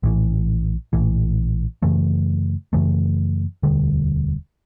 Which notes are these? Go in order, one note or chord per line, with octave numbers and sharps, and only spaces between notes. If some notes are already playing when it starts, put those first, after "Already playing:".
A#1 A2 E3
A#1 A2 E3
F#2 C#3 E3 A3
F#2 C#3 E3 A3
E1 D2 D3 G3